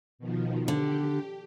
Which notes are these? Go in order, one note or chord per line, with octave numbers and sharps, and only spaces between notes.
B2 D#3 F3
D3 G4